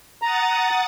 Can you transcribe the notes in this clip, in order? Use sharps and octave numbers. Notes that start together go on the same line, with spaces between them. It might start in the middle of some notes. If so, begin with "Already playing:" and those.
F#5 A#5 D#6 A6